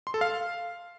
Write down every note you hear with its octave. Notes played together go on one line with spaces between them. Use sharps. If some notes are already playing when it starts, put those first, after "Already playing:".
C6
A4
F5